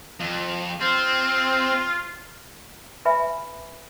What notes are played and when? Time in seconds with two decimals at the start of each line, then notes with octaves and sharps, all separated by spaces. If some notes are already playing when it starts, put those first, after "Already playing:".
0.20 F2
0.81 C4 F4
3.05 B4 E5 G#5 B5